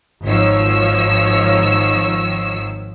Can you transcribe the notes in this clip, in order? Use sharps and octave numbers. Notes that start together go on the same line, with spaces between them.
G#1 D#3 F3 C#5 E6